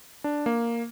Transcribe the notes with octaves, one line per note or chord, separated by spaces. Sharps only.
D4
A#3